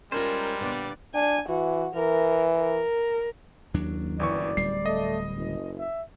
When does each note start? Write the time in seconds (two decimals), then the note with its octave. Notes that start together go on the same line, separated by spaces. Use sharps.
0.12 G3 G#3 C#4 F4 A#4 C5
0.61 A#2 D3 B3 D5
1.15 D4 G#5
1.49 E3 F#4
1.95 E3 A#4
2.58 A#4
3.74 F#1 D#2 F#3 D4
4.20 G1 E3 D5 C#6
4.57 D1 G3 C7
4.86 A3 D#5
5.37 F#1
5.78 E5